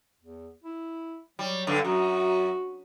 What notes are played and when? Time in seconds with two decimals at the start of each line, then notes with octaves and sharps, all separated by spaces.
0.21 E2
0.63 E4
1.39 F#3 G3
1.67 G2 D3
1.84 F#2 F#4